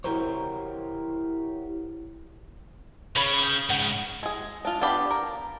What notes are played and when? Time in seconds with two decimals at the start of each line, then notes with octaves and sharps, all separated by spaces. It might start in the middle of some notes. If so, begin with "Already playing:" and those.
0.04 E4 F#4 G4 A#4 C5 C#5
3.16 C#3 C#5 B5
3.38 D#6 G6
3.70 G#2 C#3 F#5
4.23 G#3 G#4
4.65 D4 F4
4.81 B3 D4 G4 F5 B5
5.11 A#4